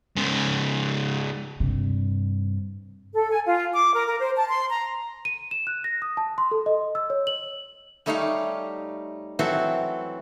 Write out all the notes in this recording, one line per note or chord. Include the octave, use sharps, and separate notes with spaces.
G#2 C#3
G2 C3
A4
G#5
F4
D6
A#4
A#4
C5
A5
C6
A#5
D#7
E7
F#6
A#6
D#6
A5
C6
A4
D#5
E6
C#5
F#7
G3 A3 D#4 G4 C#5 F5
E3 F#3 C4 F#4 A4 C5